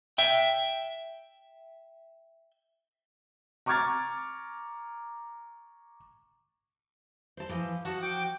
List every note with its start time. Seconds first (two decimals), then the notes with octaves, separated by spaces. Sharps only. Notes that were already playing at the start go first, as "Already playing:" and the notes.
0.18 E5 G5
3.66 A#5 C#6 D6 F6 G#6 A6
7.37 A4 C5
7.49 E3 F3
7.85 F3 F#4 F#5 A5
8.02 G5 D6